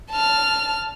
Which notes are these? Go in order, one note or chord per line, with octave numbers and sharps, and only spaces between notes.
A5 F6